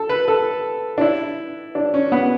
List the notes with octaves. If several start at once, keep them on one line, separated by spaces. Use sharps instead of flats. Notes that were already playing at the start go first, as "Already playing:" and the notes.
Already playing: A4
B4
A4
D4
E4
D4
C#4
B3